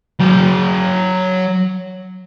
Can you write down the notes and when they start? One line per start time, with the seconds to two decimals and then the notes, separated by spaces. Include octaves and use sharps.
0.20 F#3 G5